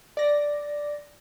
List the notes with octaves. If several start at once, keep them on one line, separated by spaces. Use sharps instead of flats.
D5 A#6